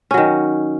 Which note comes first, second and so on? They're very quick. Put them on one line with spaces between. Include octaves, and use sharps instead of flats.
C#4 F#3 D#3